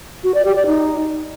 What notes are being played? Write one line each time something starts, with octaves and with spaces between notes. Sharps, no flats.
F#4
D5
G4
D5
D#4